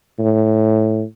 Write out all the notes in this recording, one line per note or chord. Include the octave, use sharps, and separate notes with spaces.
A2